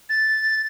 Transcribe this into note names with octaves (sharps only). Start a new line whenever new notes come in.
A6